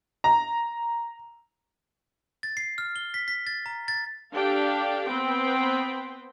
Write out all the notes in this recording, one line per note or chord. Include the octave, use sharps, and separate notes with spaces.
A#5
A6
C7
F6
G7
B6
B6
A6
A#5
A6
D4 G4 A4 F5 G5
B3 C4 B4 C5 G5